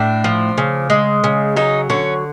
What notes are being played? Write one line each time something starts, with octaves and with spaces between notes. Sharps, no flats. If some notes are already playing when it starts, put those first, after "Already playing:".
Already playing: A2 D4
F3
C#3
G#3
C#3
F#3 D#4
D3 C#4